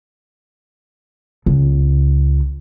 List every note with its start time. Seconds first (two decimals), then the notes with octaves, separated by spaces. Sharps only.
1.46 C#2